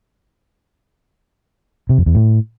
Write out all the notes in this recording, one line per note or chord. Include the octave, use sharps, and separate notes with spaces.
C3
F2
E2
A2